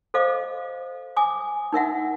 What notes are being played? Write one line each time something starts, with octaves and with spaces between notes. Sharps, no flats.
A4 C5 D#5 F5 D6
G#5 D6 D#6
D#4 A#4 E5 F#5